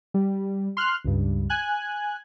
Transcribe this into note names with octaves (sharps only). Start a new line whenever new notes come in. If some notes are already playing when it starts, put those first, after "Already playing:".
G3
C6 F6 F#6
C#2 G2
G#5 F#6